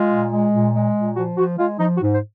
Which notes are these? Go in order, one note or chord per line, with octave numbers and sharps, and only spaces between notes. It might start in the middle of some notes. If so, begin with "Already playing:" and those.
Already playing: G#3 F4
A#2
G#3
A#2
G#3
A#2
F3 F#4
F3 F#4
G#3 F4
F3 D#4
F#4
G#2
C5